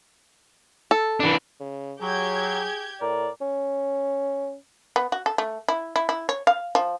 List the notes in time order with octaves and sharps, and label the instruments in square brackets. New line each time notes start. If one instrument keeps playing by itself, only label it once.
[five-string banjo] A4
[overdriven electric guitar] E3 D4
[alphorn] C#3
[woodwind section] F#3 [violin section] G4 G6 G#6 [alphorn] G#4
[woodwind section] A2 A#4 D5
[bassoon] C#4
[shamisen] B3
F#4
A4
A3
E4
E4
E4
C#5
F5
F3